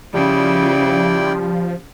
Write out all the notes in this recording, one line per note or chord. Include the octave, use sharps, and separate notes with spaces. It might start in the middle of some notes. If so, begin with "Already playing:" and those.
C#3 F3 G3 E4 D5 G5